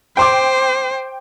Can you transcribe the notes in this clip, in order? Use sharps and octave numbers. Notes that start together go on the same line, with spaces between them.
C5 G5 C6 D6